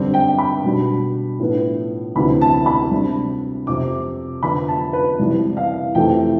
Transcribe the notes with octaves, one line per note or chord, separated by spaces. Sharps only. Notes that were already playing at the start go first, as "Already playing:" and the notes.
Already playing: G2 D3 G3 C4
G5
B5
B2 G3 D4
A2 F3 B3 D4
D2 C3 E3 B3 D4 B5
A5
B5
C3 G3 D4
F2 C3 F3 C4 D6
F2 D3 F3 B3 D4 B5
A5
B4
C2 C3 E3 G3
F5
F2 C3 E3 A3 G5